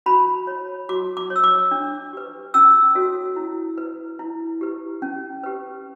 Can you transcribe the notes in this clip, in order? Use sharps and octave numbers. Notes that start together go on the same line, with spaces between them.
F#4 B5
C#5
F#4 D6
D6
C#5
E6
D6
D4
G4 B4
C#4 E6
F#4 A4 C#5
E4
B4
E4
G4 B4
C#4
G4 B4